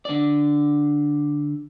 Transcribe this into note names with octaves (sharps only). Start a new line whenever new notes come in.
D3 D5